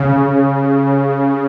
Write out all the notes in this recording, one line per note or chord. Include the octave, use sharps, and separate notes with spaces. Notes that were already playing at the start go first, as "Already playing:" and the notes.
Already playing: C#3